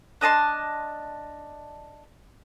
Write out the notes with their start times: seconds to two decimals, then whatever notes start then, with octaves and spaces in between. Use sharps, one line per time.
0.21 D4 D#5 A5 C6